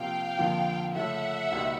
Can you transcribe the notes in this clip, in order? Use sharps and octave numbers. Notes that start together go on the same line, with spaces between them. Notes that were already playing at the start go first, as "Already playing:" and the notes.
Already playing: C3 F3 A#3 F5 G5
F2 D3 F3 A#3
C#3 F3 A3 E5 F#5
C#2 B2 G3 A#3 D#4